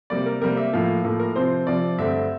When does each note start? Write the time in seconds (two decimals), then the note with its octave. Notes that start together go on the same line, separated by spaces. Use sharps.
0.10 C3 G3 A#3 D5
0.26 A#4
0.42 C3 G3 A#3 A#4
0.57 E5
0.73 A2 F3 A#3 F5
1.04 A2 F3 A#3 A4
1.20 A#4
1.36 C3 F3 C4 C5
1.67 C3 F3 C4 D5
1.98 G2 D3 A3 C4 E5